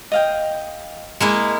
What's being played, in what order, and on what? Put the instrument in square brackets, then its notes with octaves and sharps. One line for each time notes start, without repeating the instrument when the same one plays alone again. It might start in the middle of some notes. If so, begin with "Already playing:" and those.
[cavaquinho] D#5 F5 G5
[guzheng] G#3 A#3 E4 [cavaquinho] G#5